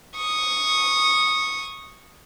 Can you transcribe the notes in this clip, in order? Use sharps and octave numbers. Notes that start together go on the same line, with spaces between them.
C#6 D#6